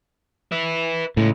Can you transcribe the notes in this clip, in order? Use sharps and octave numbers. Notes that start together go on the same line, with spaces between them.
B4 E5
A2 C#3 G#3